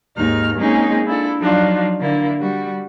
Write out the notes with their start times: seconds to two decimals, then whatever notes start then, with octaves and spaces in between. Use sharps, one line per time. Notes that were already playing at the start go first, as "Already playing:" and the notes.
0.16 D#2 G#2 D#4 F6
0.58 G#3 A#3 C4 C#4 D#4 G#4
1.05 D4 E4 F4 A4
1.40 F3 F#3 D4 D#4 F4
2.00 D3 A#3 E4
2.40 G3 F#4